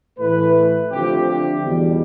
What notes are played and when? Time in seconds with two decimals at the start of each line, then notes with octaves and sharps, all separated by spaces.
0.19 A2 E3 A3 B4
0.91 D3 F3 A3 C4 G4
1.27 G4
1.62 E2 B2 G3